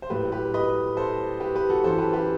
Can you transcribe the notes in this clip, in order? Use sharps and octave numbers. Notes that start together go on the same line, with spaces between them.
C5
A2 F#3 G4 B4
G4 B4
B4 D#5
A4 C5
G4 B4
G4 B4
F#4 A4
F#2 E3 A4 C5
G4 B4
G4 B4